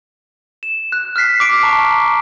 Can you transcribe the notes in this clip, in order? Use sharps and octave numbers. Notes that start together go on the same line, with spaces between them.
E7
F#6
F6 F#6 B6 C7
D6 D7
A5 A#5 C#6 D6